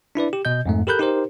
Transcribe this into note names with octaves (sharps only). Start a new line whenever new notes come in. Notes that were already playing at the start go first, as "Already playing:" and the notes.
D4 E4 B4 D5
G4
B2 D#5 G6
F2 G#2 A3
G4 A4 A#4 B5 F#6 G6
D#4 G4 A#4 C5